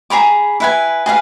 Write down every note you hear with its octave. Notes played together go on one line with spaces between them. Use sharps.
G#4 A#5 B5 D6
E4 B4 G#5
G#4 B4 F5